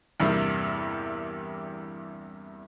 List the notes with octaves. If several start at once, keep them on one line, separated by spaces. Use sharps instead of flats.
E2 G2 C3 G3 A#3